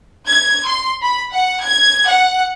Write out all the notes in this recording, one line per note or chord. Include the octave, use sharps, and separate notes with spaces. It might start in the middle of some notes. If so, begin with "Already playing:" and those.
G#6
C6
B5
F#5
G#6
F#5